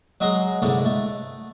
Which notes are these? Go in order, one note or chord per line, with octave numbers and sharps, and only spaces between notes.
F#3 G#3 G#4 A#5 C6
C2 G2 D3 G#3
A3